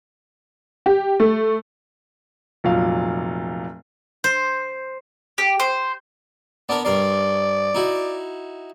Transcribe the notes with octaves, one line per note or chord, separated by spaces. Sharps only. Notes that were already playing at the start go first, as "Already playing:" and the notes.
G4
A3
F1 A#2 F#3 F5
C5
G4
C5
B3 D4 A#4 D5
G2 A#4 D5 C6
D#4 E4 F#4